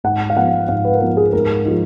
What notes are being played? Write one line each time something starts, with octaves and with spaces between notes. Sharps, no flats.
G#2 F#5
F5
F3 B3 F#5
G#2 F5
B4
A#4
F3 B3 B4
G#4
G#2 A#4
F3 G#3 D#4